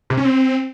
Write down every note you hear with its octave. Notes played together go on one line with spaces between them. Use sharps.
C3
C#4
C4